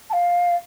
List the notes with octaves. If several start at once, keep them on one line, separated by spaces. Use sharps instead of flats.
A5
F5